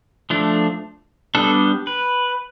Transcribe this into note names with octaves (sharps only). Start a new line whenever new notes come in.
F3 A3 D4
G3 B3 D4 A4
B4